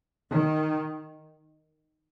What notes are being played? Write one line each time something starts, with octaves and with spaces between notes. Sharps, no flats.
D#3